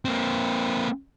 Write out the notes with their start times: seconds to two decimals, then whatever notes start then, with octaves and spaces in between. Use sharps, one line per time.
0.05 A#3 C4